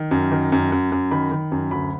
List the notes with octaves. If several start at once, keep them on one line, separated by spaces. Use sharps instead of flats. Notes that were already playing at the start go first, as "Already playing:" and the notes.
Already playing: D#3
F#2
D#3
F#2
F#2
F#2
D#3 B5
D#3
F#2
D2 B5